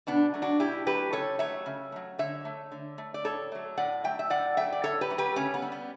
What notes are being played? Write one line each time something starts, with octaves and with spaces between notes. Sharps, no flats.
B2 B3 D4
F#3 A3
D4 F#4
B2 E4 G4
F#3 A3 G4 B4
C#3 A4 C#5
F#3 A3 C#5 E5
C#3
F#3 A3
D3 C#5 E5
A3
D3
A3
D5
A2 A4 C#5
F#3 A3
A2 D5 F#5
F#3 A3 E5 G5
E5
A2 D5 F#5
F#3 A3 E5 G5
D5
A2 A4 C#5
G4 B4
F#3 A3
G4 B4
C#3 A3 C#4
B3
G3
B3